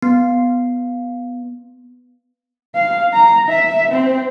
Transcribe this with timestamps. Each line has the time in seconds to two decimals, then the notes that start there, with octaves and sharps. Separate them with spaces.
0.02 B3
2.75 F5
3.13 A#5
3.49 E5
3.91 C4